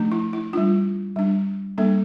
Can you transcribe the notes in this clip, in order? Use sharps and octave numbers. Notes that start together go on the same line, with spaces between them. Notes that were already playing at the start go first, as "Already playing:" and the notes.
Already playing: F3 A3 D4
E4
E4
G3 D4 F4
G3 D4
G3 A#3 D4 A4